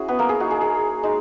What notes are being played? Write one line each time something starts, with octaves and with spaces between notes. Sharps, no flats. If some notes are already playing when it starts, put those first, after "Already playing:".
Already playing: C#4 E4 F#4 G#4
B3 B4
A#3 A#4
G#4
A#3 D#4 F#4
G#4
G#4
G#3 D#4